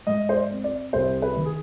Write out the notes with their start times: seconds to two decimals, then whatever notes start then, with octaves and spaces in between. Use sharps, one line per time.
0.07 G#2 D#5
0.29 C5
0.36 D5
0.51 C4
0.64 D5
0.93 C2 C5
1.22 B4
1.37 D#3
1.45 G#4